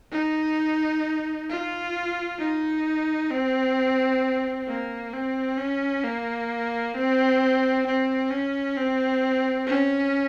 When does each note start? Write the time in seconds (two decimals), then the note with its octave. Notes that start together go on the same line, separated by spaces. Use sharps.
0.12 D#4
1.49 F4
2.39 D#4
3.31 C4
4.68 A#3
5.13 C4
5.58 C#4
6.04 A#3
6.95 C4
7.86 C4
8.31 C#4
8.77 C4
9.67 C#4